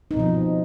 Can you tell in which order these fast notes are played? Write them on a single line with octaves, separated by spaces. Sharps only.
D#4 C4 B2 F3